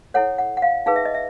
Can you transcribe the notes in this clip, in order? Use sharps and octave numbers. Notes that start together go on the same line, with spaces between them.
E4 A4 C#5 F#5
F#5
F#5
F5
D#4 G#4 B4 F5
E5
D#5
E5